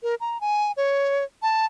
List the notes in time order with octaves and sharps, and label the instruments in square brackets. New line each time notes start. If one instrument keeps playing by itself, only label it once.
[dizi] A#4
A#5
G#5
C#5
A5